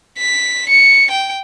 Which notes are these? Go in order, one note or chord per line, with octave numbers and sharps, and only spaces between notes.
B6
C#7
G5